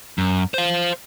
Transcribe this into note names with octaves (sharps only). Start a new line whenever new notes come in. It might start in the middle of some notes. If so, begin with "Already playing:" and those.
F#2
C5 F5